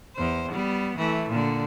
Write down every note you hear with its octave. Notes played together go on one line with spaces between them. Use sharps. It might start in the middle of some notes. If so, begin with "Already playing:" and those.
E2 C5
G3 B3
E3 A3
A#2 D3